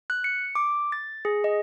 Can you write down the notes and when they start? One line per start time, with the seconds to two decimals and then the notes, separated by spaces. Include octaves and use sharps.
0.10 F#6
0.24 C#7
0.55 D6
0.92 A6
1.25 G#4
1.44 D#5